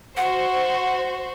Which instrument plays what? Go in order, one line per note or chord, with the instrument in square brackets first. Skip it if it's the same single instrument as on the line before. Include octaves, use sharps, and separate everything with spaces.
[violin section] F#4 C5 [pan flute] F#5